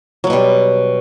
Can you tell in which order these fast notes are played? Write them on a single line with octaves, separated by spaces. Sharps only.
F#3 B3 B2 G3